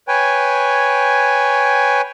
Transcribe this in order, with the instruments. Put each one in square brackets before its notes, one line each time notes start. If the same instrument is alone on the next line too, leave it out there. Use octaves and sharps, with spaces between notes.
[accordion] B4 C#5 G5 G#5